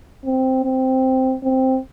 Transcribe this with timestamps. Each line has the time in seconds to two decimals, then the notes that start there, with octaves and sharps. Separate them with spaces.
0.25 C4
0.64 C4
1.43 C4